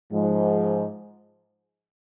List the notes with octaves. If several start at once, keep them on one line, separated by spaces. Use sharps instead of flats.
G#2 F3 G#3